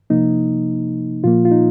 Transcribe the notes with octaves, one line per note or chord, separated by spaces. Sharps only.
C3 F3 A#3 D#4
A#2 F3 A#3 F4
F4
D#4